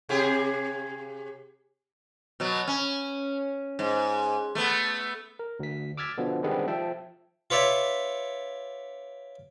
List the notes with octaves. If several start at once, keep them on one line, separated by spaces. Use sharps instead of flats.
C3 G4 G#4
B2 F#3
C#4
G#2
A3 B3
A#4
D2 B6
D6 E6 F6 G#6 A6 B6
B2 D3 F3 B3
D#3 G3 G#3 B3 C4 D4
F3 E5 G5 A5
F4 B4 C#5 D5 E5